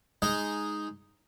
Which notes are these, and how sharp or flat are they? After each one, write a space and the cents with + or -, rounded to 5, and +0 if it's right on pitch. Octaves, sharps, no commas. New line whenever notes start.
G#3 +0 D#4 +0 D#5 +0